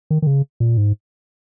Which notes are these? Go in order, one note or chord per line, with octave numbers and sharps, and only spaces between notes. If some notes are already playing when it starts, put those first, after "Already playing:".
D#3
D#3
C#3
A#2
G#2